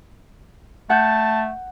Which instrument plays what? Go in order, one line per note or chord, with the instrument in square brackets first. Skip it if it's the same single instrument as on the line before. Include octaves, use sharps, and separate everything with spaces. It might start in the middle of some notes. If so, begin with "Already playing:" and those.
[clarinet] A3 [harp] F#5 G6 [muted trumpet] A5